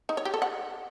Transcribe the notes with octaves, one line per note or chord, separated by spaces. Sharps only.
D#4
C#5
G4
A4
F#5